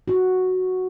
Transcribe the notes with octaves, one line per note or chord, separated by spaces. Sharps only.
F#4